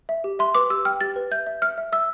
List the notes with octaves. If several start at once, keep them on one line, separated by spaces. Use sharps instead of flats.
E5
G4
E5 C6
B4 D6
G4 E6
G5 F6
G4 A6
B4
E5 G6
E5
E5 F6
E5
E5 E6